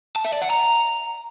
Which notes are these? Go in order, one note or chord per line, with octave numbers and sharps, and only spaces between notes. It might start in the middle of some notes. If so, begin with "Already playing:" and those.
A5
E5
D5
F#5
A#5